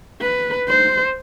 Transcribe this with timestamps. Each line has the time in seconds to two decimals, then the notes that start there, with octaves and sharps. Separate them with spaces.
0.21 B4
0.69 C5